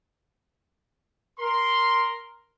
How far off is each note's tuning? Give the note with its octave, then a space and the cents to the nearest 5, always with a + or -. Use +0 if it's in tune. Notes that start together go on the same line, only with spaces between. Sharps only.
A#4 +0 C6 +0